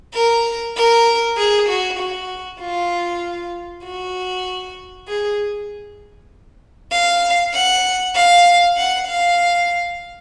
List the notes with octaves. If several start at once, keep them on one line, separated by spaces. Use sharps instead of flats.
A#4
A#4
G#4
F#4
F#4
F4
F#4
G#4
F5
F#5
F5
F#5
F5